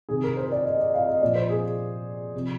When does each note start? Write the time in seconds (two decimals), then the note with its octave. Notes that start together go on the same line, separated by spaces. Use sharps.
0.09 C3 D#3 G#4
0.24 A#4
0.37 C5
0.52 D5
0.65 D#5
0.79 D5
0.94 F5
1.08 D#5
1.21 A#2 F3 D5
1.35 C5
1.49 G#4
2.34 C3 F3